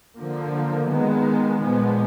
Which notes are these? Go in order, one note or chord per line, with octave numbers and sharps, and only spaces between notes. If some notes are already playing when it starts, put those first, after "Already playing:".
D3 F3 A#3
D#3 G#3 B3
A#2 F3 G#3 B3